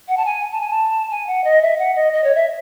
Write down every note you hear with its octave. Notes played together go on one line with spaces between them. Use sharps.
F#5
A5
G#5
A5
G#5
A5
G#5
F#5
D#5
E5
F#5
D#5
D#5
C#5
E5